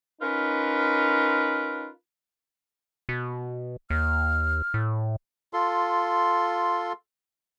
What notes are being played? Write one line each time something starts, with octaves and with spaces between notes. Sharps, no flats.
C#4 D#4 F4 A#4 B4
B2
D#2 F6
A2
F4 A4 C6